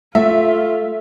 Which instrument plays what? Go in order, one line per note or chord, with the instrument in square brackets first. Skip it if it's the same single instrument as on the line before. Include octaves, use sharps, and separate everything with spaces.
[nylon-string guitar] A3 [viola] F4 [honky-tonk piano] E5